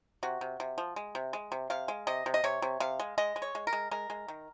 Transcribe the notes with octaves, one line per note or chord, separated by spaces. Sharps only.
C3 F#4
C3
C3
F3
G#3
C3
G#3
C3
C3 F5
G#3
C3 D#5
C3
D#5
C3 C#5
C3
C3 F5
G#3
G#3 D#5
G#3
C#5
G#3
A#4
G#3
G#3 A#4
G#3
D#3